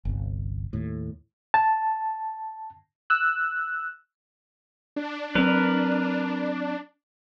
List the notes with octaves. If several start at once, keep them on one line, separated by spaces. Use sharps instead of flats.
G1 C2
D#2 A2
A5
E6 F#6
D4
F#3 C4 A#4 B4